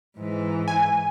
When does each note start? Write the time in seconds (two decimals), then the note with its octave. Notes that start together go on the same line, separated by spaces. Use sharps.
0.17 G#2 E3
0.68 G#5